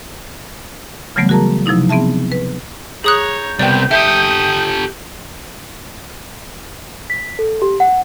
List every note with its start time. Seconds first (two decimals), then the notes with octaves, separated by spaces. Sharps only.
1.16 C#3 E3 F#3 G3 A3 B3
1.29 F#4 G#4 A#4 A5 A#5
1.66 C3 F3 F#3 D#4 E4
1.89 B3 C4 G#4 E5 A5
2.32 B4
3.04 G#4 C#5 A#5 D#6 F#6 G6
3.59 C2 C3 B3 D5 G5
3.91 G4 A4 E5 G5 D#6
7.10 B6
7.39 A4
7.62 G4
7.80 F#5